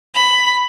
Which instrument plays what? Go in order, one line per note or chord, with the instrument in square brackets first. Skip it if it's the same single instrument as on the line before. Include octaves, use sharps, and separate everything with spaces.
[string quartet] B5